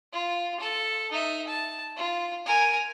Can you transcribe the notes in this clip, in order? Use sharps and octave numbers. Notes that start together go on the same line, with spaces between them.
F4
A4
D#4 E5
A5
F4
A#4 G#5